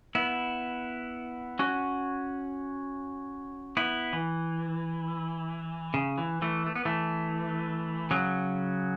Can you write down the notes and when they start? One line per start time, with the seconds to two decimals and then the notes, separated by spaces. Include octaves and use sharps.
0.15 B3 E4
1.59 C#4 F#4
3.77 B3 E4
4.13 E3
5.94 C#3
6.18 E3
6.42 E3 A3
6.66 A3
6.75 B3
6.85 E3 A3
8.11 C#3 F#3